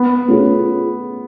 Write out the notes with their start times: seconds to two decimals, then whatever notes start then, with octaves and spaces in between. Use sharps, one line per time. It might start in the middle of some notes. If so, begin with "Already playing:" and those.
Already playing: B3
0.28 A3 C#4 F4 G#4